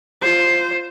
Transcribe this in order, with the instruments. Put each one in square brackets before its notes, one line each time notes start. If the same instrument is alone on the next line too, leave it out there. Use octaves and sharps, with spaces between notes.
[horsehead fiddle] F4 C5